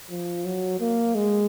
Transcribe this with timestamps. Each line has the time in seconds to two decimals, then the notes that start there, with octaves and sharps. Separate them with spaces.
0.10 F3
0.45 F#3
0.80 A#3
1.15 G#3